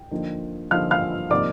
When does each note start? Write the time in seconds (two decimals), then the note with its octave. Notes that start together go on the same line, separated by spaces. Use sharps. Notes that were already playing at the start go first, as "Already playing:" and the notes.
Already playing: G5
0.11 D3 F3 A#3 D#4
0.71 D3 F3 A#3 D#4 F5 F6
0.91 F5 F6
1.31 C3 F3 A#3 D#4 D5 D6